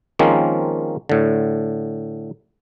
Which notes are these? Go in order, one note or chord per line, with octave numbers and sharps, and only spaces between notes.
D#3 F3 G#3 A#3 C4 C#4
A2 D3